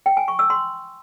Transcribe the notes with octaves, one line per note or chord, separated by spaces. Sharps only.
G5
G#5
C#6
E6
C6